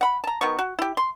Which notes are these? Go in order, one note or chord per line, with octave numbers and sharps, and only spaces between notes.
F#5 B5
A5 A#5
D#3 F#3 B3 C#6
F#4
E4 G4
C6